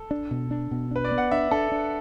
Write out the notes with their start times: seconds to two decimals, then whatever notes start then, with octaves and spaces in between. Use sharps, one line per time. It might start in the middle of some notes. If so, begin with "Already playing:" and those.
Already playing: A4
0.11 D4
0.31 B2
0.51 D4
0.71 B2
0.91 D4 B4
1.05 D5
1.12 B3
1.18 F#5
1.31 D4 E5
1.51 D4 A4
1.72 D4